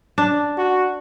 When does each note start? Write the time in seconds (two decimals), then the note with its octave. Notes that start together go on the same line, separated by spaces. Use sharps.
0.18 D4
0.58 F#4